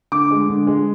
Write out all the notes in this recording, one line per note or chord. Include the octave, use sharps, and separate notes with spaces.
D3 D6
G#3
D3
G#3